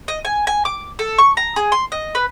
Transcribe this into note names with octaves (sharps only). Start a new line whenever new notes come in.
D#5
G#5
G#5
D6
A4
C#6
A#5
G#4
C6
D#5
B4